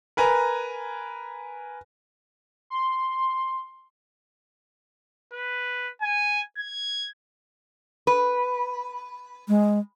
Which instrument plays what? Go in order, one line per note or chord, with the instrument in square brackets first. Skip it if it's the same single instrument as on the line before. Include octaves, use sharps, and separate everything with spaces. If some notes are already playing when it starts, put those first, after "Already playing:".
[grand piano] A#4 B4 G#5 A#5
[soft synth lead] C6
[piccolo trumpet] B4
G#5
G#6
[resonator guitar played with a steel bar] B4
[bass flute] G#3